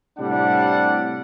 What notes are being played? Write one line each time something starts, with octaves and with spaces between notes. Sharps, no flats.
A2 C3 G3 D4 F#5